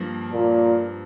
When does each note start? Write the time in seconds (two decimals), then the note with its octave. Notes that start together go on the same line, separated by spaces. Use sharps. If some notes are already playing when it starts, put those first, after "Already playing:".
Already playing: G2 F3 A#3
0.32 A#2